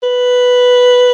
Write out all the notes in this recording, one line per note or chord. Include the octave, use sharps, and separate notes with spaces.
B4